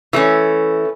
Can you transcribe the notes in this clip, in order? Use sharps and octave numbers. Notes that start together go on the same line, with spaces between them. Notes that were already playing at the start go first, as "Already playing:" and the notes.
E3 A3 C#4